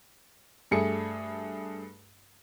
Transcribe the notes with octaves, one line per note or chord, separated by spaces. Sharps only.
G2 A3 G#4 C#7